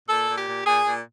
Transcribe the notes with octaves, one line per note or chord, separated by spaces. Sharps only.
A#2 A4
A#2
G4
A#2
A#2 G#4
A#2